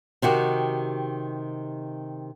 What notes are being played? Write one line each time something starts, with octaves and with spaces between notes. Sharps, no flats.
C3 D#3 F#4 G4